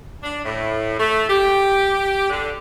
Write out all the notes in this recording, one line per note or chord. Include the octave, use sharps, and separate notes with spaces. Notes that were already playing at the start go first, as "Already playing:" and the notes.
D4
A2
A3
G4
D3